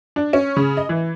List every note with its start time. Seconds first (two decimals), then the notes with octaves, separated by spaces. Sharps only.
0.16 D4
0.33 C#4
0.56 C#3
0.77 D#5
0.89 E3